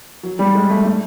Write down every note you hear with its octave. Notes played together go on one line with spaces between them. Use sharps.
F#3
G3
G#3
A3
A3